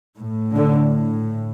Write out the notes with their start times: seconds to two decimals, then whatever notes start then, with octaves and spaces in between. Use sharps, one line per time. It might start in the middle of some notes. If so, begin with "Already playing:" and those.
0.16 A2
0.55 D3